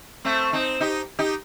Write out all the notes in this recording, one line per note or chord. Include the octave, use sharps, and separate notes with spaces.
A3 C4
C4 D#4
D#4 G4
D#4 G4